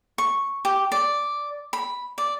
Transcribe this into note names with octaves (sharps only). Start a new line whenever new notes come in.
C#6
G4
D5
B5
D5